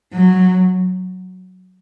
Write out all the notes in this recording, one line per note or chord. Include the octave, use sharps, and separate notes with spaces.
F#3